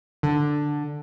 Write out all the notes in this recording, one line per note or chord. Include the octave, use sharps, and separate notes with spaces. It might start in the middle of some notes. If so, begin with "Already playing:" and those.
D3